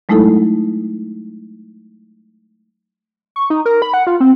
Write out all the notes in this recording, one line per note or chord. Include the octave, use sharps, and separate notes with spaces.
F#3 G#3 A3 D#4 E4 A4
C#6
D#4
A#4
B5
F#5
F4
C4